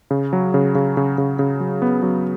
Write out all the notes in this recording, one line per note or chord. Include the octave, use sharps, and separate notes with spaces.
C#3
F#3
C#3
C#3
C#3
C#3
C#3
F#3
B3
F#3